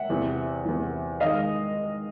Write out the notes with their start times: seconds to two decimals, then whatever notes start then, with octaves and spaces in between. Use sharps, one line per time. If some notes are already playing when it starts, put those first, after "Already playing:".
Already playing: E5 F#5
0.10 E2 C3 E3
0.65 E2 C3 E3
1.20 D#3 G#3 D#5 F5